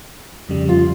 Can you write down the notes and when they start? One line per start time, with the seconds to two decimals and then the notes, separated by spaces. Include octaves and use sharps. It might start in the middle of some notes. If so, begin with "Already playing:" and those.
0.49 F2 C#3 G3
0.69 F4